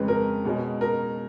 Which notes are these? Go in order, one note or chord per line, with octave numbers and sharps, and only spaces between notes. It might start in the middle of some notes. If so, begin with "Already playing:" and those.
Already playing: F2 C#3 G#3 C#4 B4
A#4
B2 G#3 C#4
A#4